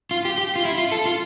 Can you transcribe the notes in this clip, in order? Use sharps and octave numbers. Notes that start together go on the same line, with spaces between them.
F4
G4
G4
F4
E4
F4
A4
F4